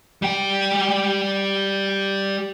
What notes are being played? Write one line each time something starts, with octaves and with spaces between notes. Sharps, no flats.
G3 G5